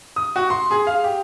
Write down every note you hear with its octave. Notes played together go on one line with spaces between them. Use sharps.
D#6
F#4
C6
G#4
F5
G4